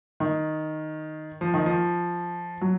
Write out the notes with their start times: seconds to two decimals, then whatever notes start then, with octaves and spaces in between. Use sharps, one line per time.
0.20 D#3
1.41 F3
1.54 D#3
1.66 F3
2.61 F#3